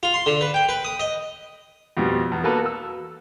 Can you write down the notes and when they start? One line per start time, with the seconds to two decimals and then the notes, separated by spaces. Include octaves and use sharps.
0.03 F4
0.14 C6
0.26 D3
0.41 B4
0.54 G5
0.69 B4
0.85 D#6
0.99 D#5
1.97 F2 B2 G3
2.32 E2
2.44 A#3 F#4 A4 B4
2.66 E6